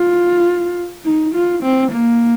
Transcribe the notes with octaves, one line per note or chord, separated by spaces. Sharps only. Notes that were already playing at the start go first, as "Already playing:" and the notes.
Already playing: F4
D#4
F4
C4
A#3